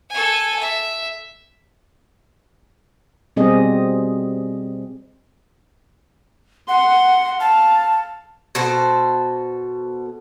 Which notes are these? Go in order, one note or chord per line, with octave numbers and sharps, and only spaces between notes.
A4 G#5
E5
B2 G3 C4 G4 G#4 D#5
F#5 C6
F5 A5
B2 A4 C5